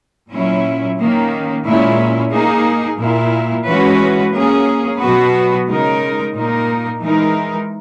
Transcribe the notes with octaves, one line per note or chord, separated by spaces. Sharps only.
A#2 F#3 C#4 E4
D#3 A#3 C#4
A#2 G#3 C#4 E4
A#3 D#4 G#4
A#2 A#3 E4
E3 G#3 C#4 F#4 B4
A#3 C#4 G#4
B2 F#3 B3 F#4 B4
C#3 G#3 D#4 A#4
A#2 A#3 D#4 A#4
E3 G#3 D#4 A#4